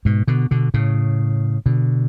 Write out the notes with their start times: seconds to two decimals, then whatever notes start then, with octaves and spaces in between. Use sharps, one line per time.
0.05 G#2 B2
0.28 B2 D3
0.51 B2 D3
0.74 A2 C#3
1.66 B2 D3